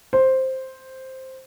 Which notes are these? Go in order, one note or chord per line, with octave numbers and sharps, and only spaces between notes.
C5